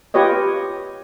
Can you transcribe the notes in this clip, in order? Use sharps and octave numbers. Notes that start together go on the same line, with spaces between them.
F4 G4 B4 C#5 D#5